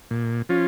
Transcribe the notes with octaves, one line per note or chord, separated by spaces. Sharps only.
A#2
F3 C#4 F4